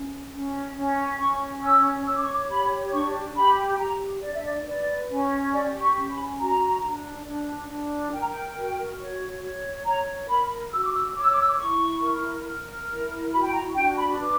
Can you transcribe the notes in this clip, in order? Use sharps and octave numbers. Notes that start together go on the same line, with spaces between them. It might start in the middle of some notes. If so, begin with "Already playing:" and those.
Already playing: C#4
C#4
C#4
C#4 C#6
C#5 E6
C#5 E6
D6
C#6
D6
G4 B5
D4 C#6
G4 B5
G5
G4 A#5
D4 D5
E5
D5
B4 D5
C#4
G4 D5
C#6
C#4
B5
F#4 A#5
D4
D4
D4
A#4 G5
A#5
G5
F#4
C#5
C#5
C#5 A#5
A#4 B5
F#4 E6
D6
E6
C#5 D6
E6
D6
E6
D6
E4 C#6
A#4
A#4
E4
F#4 B5
G5
A#5
D4 G5
B5
B4 D6